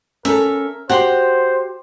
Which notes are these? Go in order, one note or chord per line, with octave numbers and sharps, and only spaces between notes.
C#4 A4 A#4 E5
F#4 G4 C5 F#5 C6